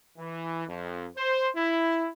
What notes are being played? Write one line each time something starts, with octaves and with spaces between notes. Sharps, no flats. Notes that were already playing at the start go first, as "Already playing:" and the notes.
E3
F2
C5
E4